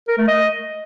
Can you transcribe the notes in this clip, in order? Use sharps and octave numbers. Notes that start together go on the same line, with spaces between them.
A#4
A3
D#5